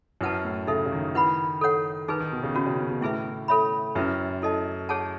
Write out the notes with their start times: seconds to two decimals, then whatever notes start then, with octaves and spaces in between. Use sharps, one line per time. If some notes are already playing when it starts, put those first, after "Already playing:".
0.21 F#2 E4 B4 F#5 A5
0.45 A2
0.67 C#3 D#4 A4 E5
0.86 C#3
0.92 D#3
1.15 E4 B4 F#5 B5
1.61 A4 C#5 F#5
2.08 D#3 D#4 G#4 B4
2.20 D#3
2.32 B2
2.43 C#3
2.55 B2 C#4 F#4 C#5
2.67 C#3
2.79 B2
2.90 B2
3.01 A2 E4 G#4 B4 E5
3.48 A4 C#5 E5 B5
3.95 F#2 C#4 E4 B4 E5
4.42 E4 A4 D#5 A5
4.89 G#4 C#5 F#5 A5